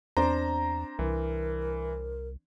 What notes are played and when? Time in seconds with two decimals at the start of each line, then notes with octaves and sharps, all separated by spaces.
0.17 E2 C4 D4 C5 A#5
0.99 C2 E3 A#4